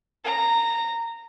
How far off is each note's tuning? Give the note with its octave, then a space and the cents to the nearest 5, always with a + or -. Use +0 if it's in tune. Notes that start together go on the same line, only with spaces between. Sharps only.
A#5 -15